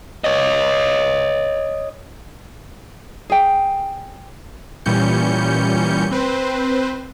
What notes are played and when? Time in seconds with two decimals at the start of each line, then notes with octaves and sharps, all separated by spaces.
0.24 C#5 D#5
3.30 G#4 G5
4.86 A#2 E3 G3 C#4 G6 C#7
6.11 C4 B4 C5